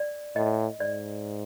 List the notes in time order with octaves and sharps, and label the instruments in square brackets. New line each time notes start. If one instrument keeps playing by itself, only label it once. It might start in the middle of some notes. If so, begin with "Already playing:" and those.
Already playing: [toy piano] D5
[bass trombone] A2 [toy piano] D#5
[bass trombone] G#2 [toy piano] D5